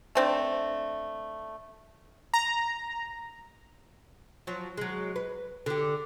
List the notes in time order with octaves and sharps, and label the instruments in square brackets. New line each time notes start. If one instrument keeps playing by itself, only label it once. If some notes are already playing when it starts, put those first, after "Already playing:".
[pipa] A3 C4 D4
[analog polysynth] A#5
[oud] F3 F#3
F#3 G#3
B4
D3 G4